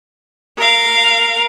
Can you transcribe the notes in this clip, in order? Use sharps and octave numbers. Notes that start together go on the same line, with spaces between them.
A#4 F5